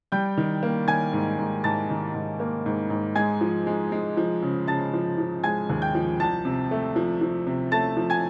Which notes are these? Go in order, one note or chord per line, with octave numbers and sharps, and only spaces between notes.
G3 G5 G6
D#3
A#3
D#3 G#5 G#6
G#2
G#2
G#2 A5 A6
D#3
G#2
A#3
G#2
G#2
G#3 G#5 G#6
F3
G#3
G#3
F3
C#3
C#3 A5 A6
F3
F3
G#3 G#5 G#6
D#2
G5 G6
F3
C2 A5 A6
C3
A3
F3
F3
C3
A3 A5 A6
F3
G#5 G#6